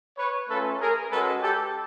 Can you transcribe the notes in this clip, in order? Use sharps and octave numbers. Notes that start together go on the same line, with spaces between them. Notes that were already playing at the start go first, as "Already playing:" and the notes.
B4 C#5
A3 C#4 F4 A4 B4
G#4 A#4
G#3 C#4 F#4 A4 B4
G4 A4